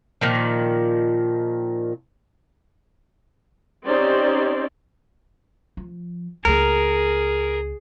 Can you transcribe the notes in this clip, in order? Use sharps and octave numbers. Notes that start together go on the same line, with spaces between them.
A#2 D#3 F3
C4 C#4 D#4 G4 C5 D5
F3
C#2 A#3 G#4 A#4